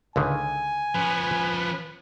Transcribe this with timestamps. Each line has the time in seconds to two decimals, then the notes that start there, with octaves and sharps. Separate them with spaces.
0.16 C#2 D3 D#3 G#5
0.95 F3 C#4 B4